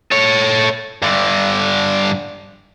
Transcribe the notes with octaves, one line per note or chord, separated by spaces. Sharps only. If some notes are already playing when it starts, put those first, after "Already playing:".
A4 C#5
G2 D3